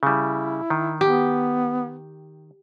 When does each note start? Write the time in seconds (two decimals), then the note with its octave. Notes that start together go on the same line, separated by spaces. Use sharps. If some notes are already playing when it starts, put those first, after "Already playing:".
0.03 C#3 G3 E4
0.70 D#3
1.01 B3 G4